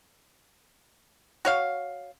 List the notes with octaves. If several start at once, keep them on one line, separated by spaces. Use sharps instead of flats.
F#4 C#5 F5